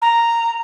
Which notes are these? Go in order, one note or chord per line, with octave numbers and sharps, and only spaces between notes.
A#5